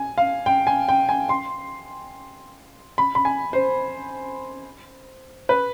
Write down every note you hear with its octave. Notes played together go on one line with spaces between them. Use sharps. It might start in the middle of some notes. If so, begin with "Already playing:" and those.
Already playing: G#5
F5
G5
G#5
G5
G#5
C6
B5
B5
G#5
C5
B4